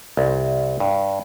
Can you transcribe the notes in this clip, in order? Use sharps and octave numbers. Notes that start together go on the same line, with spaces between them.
C2
G2